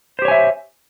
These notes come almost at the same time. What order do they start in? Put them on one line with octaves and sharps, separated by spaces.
C5 G4 C#5 G#5 E5